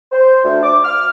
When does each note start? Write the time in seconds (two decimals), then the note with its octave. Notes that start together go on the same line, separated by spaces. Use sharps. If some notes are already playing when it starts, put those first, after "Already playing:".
0.12 C5
0.44 D2
0.63 D6
0.84 F6